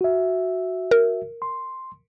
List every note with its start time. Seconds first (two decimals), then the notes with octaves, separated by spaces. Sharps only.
0.01 F#4 E5
0.91 A#4
1.42 C6